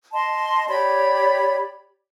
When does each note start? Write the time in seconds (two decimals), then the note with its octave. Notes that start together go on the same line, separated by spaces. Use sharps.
0.12 D#5 A5 C6
0.68 G4 C#5 D5 B5